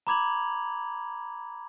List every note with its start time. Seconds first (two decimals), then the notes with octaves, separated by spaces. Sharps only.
0.07 A#5 B5 D6 G#6 F7 F#7